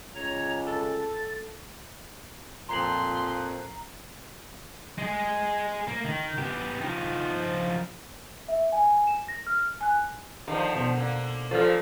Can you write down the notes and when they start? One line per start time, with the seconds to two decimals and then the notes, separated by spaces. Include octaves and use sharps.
0.15 C#2 C#5 A#5
0.67 A4 A6
2.69 F2 A#2 A#5 C6 C7 F#7
4.98 G#3 G#4
5.87 A#3
6.05 D#3
6.38 B3 G4
6.81 F3 D#4
8.48 E5
8.72 G#5
9.07 E7
9.28 A#6
9.47 F6
9.81 G#5 F#6
10.48 D3 D#3 F3 F5 A#5
10.75 B2 C5
10.96 D3 A#3
11.51 A#2 F3 F4 A4 C5 F5